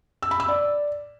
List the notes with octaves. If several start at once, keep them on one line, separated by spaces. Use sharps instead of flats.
E6
B5
E6
D5